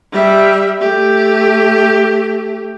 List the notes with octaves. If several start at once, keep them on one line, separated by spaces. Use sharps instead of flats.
G3 E5
A3 G4